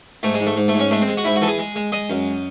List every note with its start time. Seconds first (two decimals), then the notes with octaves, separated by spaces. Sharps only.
0.23 G#2 A3
0.34 G#3
0.40 G#2
0.46 A3
0.57 G#2
0.68 A3
0.74 G#2
0.80 C#4
0.91 G#3 A3
1.02 C4
1.08 G#3
1.17 F#4
1.24 G#2 E4
1.36 F#4
1.42 E3 A4
1.48 G#4
1.59 G#3
1.76 G#3
1.92 G#3 D#5
2.10 F#2